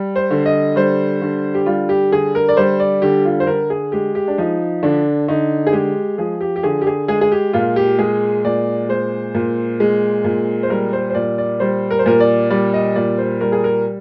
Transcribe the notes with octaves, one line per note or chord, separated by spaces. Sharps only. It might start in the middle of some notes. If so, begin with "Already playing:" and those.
Already playing: G3
C5
D3
D#5
G3 C5
D3
G4
G3 F4
G4
D3 G#4
A#4
D5
G3 C5
D5
D3 G4
F4
C5
D3 A#4
G#4
G#3 G4
G4
D4
F3 D#4
D3 D4
D3 D#4
G#4
G#3 G4
F3 G#4
G4
G4
D3 G#4
G4
G#4
G#3 G#4
G#4
G4
A#2 F4
G4
G#3 G#4
A#2 D5
G#3 C5
A#2
G#3
A#2
C5
G3 A#4
C5
C5
A#2 D5
D5
G3 C5
A#4
C5
A#2 A#4
D5
G3 D5
D#5
A#2 D5
C5
G3 A#4
G#4
A#4